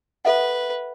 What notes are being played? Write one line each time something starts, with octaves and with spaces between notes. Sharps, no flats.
A4 B4 E5 F#5